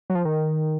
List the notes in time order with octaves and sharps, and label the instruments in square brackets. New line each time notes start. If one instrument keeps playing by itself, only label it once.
[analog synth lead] F#3
F3
D#3